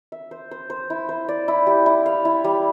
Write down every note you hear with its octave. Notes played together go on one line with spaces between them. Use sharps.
E5
C5
C5
C5
E4
C5
D5
E4
G4
E4
F5
E4
G3